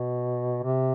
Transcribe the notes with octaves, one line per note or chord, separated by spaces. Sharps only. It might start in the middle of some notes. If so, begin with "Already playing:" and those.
Already playing: B2
C3